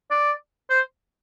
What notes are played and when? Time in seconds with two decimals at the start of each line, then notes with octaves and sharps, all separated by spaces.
0.11 D5
0.70 C5